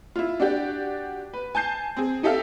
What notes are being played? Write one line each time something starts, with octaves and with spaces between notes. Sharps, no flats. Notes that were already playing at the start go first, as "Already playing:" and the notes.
E4 F4
D4 F#4 G4 D5
B4
G#5 A5 G6 C7
C4 G#4
D#4 G4 A4 E5 F5